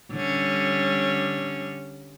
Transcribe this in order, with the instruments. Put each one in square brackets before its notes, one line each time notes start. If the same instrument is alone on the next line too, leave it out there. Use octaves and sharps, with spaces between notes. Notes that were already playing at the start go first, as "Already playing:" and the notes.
[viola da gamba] D3 G3 C#4